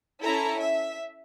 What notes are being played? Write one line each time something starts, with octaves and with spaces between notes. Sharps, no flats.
C#4 E4 A4 A#5
E5